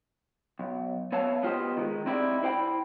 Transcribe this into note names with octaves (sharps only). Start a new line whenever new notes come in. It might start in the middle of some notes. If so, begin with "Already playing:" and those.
B1
B3 C#5 E5 F5 A5
B3 F4 G4 C5 D#5
D#3 F#3 G#3
C4 D#4 E4 G4 C5 D5
E4 C5 G5 B5